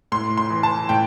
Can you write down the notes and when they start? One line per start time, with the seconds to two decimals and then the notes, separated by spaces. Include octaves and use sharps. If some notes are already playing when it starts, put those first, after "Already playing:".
0.12 A2 C6
0.37 C6
0.50 E3
0.63 A5
0.89 A2 G5